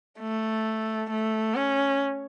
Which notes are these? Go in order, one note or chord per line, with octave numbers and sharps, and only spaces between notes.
A3
A3
C#4